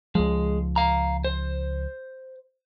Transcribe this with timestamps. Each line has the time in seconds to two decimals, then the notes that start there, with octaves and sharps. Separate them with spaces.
0.15 C#2 F3 G#3
0.76 F5 A#5
1.24 C5